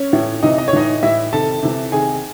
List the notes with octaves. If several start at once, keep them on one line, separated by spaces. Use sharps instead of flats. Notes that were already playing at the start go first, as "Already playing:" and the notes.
Already playing: C#4 C#5
A2 E3
C3 E3 D#4 D#5
D#5
C#5
A2 E3 D#4 D#5
A2 E3 E4 E5
C3 D#3 A4 A5
C3 E3
C3 D#3 G#4 G#5